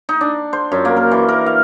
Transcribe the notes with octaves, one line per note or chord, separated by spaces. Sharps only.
D#4
D4
C5
F#2
A#3
A#4
E3
A#4
F5